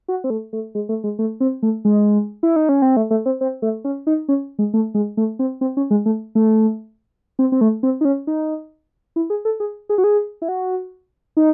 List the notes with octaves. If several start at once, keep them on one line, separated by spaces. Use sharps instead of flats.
F#4
C4
A3
A3
G#3
A3
G#3
A3
C4
A3
G#3
E4
D#4
C#4
C4
A3
A3
C4
C4
A3
C#4
D#4
C#4
G#3
A3
G#3
A3
C4
C4
C#4
G#3
A3
A3
C4
C4
A3
C4
D#4
C#4
D#4
E4
G#4
A4
G#4
G#4
F#4
G#4
E4
F#4
D#4